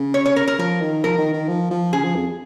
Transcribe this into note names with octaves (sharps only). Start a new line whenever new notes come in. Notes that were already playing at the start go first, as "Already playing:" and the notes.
Already playing: C#3
C#5
C#5
A#4
A#4
F3 A#4
D#3
F3 A#4
D#3
D#3
F3
F3
C#3 G#4
F3
F2